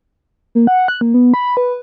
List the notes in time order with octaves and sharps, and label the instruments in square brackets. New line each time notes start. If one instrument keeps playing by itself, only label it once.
[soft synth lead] A#3
F#5
F#6
A#3
B3
B5
B4